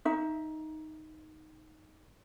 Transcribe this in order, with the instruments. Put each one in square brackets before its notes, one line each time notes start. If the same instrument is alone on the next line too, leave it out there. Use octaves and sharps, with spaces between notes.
[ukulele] D#4 E5